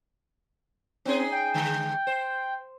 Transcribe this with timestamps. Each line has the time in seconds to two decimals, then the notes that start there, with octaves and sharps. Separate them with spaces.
1.05 C4 C#4 D#4 G#4
1.32 G5
1.54 D3 G#3
2.07 C5